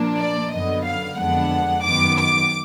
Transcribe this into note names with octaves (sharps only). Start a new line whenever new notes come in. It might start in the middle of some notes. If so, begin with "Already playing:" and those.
Already playing: A#2 F3 A#3 D4
D5
F#2 D3 F#3 B3 D#5
F5
F2 D3 G#3 B3 D4 F#5
F#2 D#3 F#3 B3 D6
D6